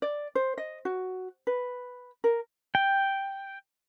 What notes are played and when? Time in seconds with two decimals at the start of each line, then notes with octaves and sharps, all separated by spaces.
0.02 D5
0.35 C5
0.58 D#5
0.85 F#4
1.47 B4
2.24 A#4
2.75 G5